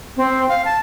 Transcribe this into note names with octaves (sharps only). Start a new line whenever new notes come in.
C4
F5
A5